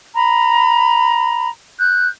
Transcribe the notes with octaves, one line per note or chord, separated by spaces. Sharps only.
A#5 B5
F#6 G6